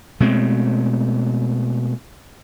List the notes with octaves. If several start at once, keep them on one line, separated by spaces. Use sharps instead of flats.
B2 G#3 A3 C4